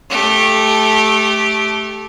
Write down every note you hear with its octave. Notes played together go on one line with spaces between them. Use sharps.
A3 G4